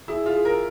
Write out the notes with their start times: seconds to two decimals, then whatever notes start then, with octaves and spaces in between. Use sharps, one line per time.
0.08 E4 G#4
0.26 F4
0.35 G#4
0.45 A#4